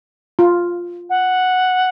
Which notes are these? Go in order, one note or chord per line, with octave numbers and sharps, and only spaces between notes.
F4
F#5